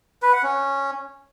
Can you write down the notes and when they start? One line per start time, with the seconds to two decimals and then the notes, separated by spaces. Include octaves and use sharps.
0.22 B4
0.33 F#5
0.43 C#4